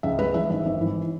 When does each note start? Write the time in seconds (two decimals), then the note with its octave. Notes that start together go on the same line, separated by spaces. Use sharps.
0.03 C#2 E5
0.18 G#3 B4
0.34 E3 E5
0.50 G#1 E5
0.66 G#1
0.81 E3